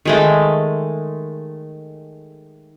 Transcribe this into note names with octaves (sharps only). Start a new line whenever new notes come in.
D#3 G#3 A3